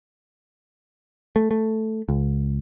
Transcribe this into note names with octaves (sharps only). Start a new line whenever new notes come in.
A3
A3
C#2